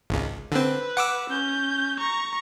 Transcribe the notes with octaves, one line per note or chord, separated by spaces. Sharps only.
G#1 C#2
D3 C4 B4
F#5 D6 E6
C#4 G6
A#5 C#6